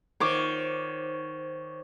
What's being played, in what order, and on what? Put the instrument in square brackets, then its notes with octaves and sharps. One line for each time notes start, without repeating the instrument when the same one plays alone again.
[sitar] D#3 [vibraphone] C5 [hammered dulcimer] C#5 D6